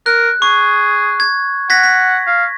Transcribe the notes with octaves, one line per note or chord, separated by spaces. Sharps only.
A#4 F#6
G#4 C#6
G#6
F#5 G#6 A#6 B6
B6
F5